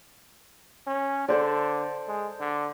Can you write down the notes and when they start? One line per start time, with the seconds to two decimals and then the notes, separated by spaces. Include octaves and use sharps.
0.87 C#4
1.28 D3 A4 C5 D5
2.08 G#3
2.40 D3